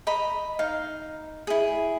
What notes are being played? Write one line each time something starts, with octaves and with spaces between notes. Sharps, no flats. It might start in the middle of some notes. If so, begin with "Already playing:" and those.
D#5 A#5 B5
D#4 F5
E4 G#4